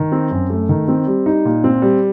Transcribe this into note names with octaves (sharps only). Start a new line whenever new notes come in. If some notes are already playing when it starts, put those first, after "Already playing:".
Already playing: D#3
C4
F#2
A3
D#3
C4
G3
D#4
A#2
C4
G3